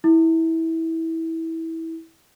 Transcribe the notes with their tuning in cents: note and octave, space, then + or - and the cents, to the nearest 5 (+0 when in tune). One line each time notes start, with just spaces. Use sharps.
E4 -20